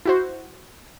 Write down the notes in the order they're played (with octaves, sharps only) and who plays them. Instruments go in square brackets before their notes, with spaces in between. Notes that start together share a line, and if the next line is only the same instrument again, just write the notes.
[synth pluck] E4 F#4 C5